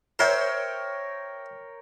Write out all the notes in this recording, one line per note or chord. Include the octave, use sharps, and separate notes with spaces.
A#4 C5 C#5 E5 G5